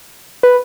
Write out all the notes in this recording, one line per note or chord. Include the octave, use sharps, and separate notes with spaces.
B4